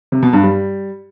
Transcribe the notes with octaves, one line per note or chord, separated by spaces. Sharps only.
C3
B2
G2
G3